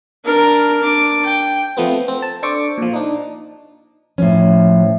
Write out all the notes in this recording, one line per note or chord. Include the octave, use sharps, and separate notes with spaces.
D4 A#4
D4 D6
G5
F3 A3 B3 C4
C4
A5
D4 A4 C5 C#6 D6
A#2 F3
D4 D#4
A2 F3 C#4